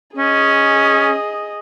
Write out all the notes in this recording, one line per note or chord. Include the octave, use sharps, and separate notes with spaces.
C#4 G#4 D#5